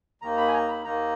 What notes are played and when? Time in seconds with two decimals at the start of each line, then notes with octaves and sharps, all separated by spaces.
0.22 D#2 D#3 A#3 D#4 A#5
0.37 B5
0.47 G#5
0.54 A#5
0.69 B5
0.84 D#2 D#3 A#3 D#4 A#5